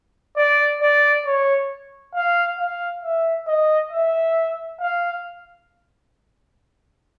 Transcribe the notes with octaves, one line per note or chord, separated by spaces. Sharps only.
D5
D5
C#5
F5
F5
E5
D#5
E5
F5